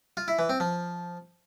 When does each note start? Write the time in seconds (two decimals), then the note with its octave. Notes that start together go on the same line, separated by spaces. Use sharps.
0.17 F4
0.28 E4
0.39 E3
0.49 C4
0.60 F3